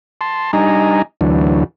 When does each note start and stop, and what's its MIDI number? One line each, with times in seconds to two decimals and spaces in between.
0.21 0.51 81
0.21 0.51 84
0.53 1.02 55
0.53 1.02 62
0.53 1.02 63
0.53 1.02 75
0.53 1.02 80
0.53 1.02 82
1.21 1.64 38
1.21 1.64 52
1.21 1.64 54
1.21 1.64 62